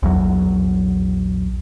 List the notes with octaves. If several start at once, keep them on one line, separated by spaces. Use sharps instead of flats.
A#1 E2 F#3